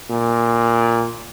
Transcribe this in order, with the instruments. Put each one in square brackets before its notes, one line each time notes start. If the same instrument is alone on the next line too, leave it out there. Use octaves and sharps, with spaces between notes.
[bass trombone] A#2